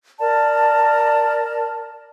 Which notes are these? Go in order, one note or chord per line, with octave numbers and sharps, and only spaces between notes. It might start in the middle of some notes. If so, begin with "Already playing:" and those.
A#4 D5 A5